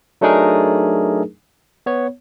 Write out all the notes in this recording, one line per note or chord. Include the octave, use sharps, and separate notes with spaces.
F#3 A3 D4 D#4 G#4 A#4
B3 C#5